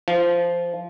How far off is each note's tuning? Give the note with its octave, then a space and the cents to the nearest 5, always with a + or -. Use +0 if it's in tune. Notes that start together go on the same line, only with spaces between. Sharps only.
F3 -10